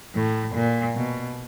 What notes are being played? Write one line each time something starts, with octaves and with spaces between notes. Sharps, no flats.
A2
A#2
B2